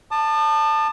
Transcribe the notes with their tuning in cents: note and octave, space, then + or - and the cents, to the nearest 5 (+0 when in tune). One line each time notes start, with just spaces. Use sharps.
A5 +10 D#6 -45